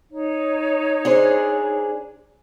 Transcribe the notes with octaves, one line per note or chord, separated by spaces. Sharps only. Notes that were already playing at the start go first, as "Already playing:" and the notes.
D#4 C#5
D4 G#4 C5